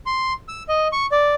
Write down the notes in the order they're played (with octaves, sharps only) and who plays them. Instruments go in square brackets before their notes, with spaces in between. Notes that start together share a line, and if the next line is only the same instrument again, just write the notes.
[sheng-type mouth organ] C6
E6
D#5
C#6
D5